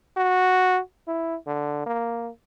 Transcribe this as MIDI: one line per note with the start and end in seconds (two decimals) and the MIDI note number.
0.17 0.80 66
1.08 1.36 64
1.47 1.85 50
1.86 2.30 58